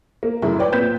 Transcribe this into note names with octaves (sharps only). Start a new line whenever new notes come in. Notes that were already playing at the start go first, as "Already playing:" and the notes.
A#3
F#2 C#3 F#3 A3 E4
B4 C#5 D5 G5
A#2 C4 B4 G6 B6 E7